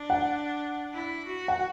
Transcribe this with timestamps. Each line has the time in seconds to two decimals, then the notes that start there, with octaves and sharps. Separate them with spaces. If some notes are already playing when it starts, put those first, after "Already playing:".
Already playing: D4
0.10 F#5
0.93 E4
1.26 F#4
1.48 F#5